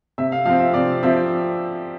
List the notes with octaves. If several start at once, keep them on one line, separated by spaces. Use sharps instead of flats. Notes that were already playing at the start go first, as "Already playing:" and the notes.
C3 E5
F5
F3 C4 F5
E5
C3 D5
F3 C4 E5